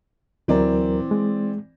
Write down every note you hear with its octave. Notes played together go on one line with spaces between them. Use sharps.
D2 E3 F#3 C4 A#4 D5
G#3